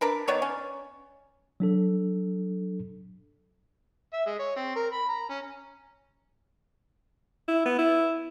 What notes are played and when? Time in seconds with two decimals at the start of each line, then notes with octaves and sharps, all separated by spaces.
0.01 D4 A#4 B4
0.28 D#3 B3 C#5 D5
0.42 C#4
1.60 F#3 D4 A4
4.13 E5
4.26 G#3
4.39 C#5
4.56 C4
4.75 A#4
4.92 B5
5.09 A#5
5.29 C#4
7.48 E4
7.66 B3
7.78 E4